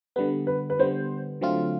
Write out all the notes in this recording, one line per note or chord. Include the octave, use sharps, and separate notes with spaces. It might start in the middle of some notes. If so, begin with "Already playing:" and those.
D3 G3 B3 B4
B4
B4
D3 G3 B3 C5
D3 F#3 A3 C4 F4